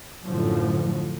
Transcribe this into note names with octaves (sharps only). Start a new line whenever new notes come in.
F#2 A2 D3 F3 F#3